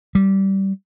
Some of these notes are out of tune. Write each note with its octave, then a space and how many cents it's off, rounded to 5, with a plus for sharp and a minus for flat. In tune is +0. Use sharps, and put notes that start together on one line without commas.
G3 -15